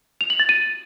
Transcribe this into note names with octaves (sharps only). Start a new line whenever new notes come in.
F7
F#7
A6
D#7